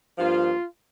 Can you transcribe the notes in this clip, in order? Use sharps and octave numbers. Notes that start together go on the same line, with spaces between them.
G2 F3 A#3 F4